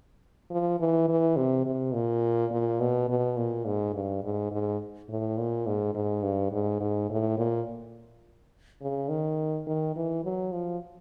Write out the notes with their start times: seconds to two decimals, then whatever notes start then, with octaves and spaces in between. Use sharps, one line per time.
0.51 F3
0.80 E3
1.09 E3
1.36 C3
1.66 C3
1.94 A#2
2.52 A#2
2.80 B2
3.09 B2
3.37 A#2
3.66 G#2
3.94 G2
4.24 G#2
4.52 G#2
5.09 A2
5.38 A#2
5.67 G#2
5.95 G#2
6.23 G2
6.52 G#2
6.80 G#2
7.10 A2
7.38 A#2
8.81 C#3
9.09 D#3
9.67 D#3
9.96 E3
10.24 F#3
10.52 F3